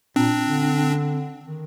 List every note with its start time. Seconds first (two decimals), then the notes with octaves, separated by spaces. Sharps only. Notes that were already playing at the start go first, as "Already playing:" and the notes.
0.16 A#2 C4 D4
0.45 D3
1.45 D#3